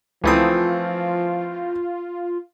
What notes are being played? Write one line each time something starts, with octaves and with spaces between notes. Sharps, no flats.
C#2 E3 F3 A3 C4 E4 F4 D#6